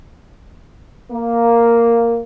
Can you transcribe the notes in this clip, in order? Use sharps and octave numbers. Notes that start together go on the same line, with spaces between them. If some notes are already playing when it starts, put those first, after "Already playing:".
A#3